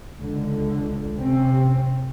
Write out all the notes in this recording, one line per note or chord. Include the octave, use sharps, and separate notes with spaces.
C#2 D3
C3 C4 C#4